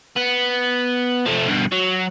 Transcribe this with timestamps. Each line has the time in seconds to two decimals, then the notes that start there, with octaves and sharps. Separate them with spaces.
0.16 B3
1.26 F3 A3
1.49 G2 B2
1.72 F#3